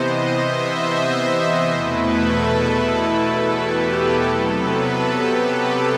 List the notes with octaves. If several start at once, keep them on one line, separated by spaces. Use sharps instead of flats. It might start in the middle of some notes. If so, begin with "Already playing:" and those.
Already playing: C3 E3 B3 C5 D#5
C5
E5
C5
E2 B2 A3 E4 B4
A4
G4
C3 F#3 B3 A4
B4
A4
G4
A4